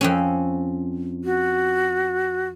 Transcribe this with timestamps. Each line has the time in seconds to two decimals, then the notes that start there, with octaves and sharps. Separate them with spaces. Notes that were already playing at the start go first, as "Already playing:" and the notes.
0.01 F2 C4 C#4
1.24 F#4